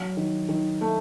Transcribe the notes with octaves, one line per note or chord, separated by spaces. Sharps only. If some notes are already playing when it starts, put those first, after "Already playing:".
Already playing: F#3
D#3
D#3
A3